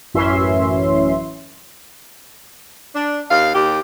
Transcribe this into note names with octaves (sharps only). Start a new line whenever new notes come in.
A1 F#2 E3 C#4 E5 C6
D4
D#2 F5
D#2 G4